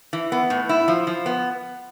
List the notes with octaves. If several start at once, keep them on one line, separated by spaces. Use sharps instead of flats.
E3
B3
A2
E4
F3
F3
B3